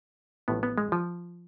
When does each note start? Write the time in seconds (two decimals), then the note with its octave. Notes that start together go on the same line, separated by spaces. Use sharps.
0.48 A1 A2 F3 B3
0.63 B3
0.78 G#3
0.92 F3